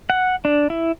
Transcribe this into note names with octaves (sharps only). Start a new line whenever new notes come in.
F#5
D4
E4